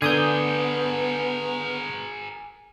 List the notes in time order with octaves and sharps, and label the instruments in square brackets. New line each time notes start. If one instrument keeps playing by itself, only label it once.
[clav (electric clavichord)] D3 [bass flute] B3 [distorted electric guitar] G#4 A#4 [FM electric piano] G#5 D#6 G6